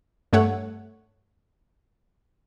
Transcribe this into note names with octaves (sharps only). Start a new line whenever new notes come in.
G2 A3 C#5 F#5